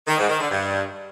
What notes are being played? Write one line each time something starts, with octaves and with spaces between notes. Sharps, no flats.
D#3
G#2
D#3
D3
G2